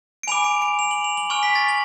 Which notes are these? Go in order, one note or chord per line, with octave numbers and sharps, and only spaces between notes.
D7
G#5 B5 D6 F7
D7
D7
F7
F#7
F7
F#7
G#5 C#6 F6 F7
B6
A6
F#7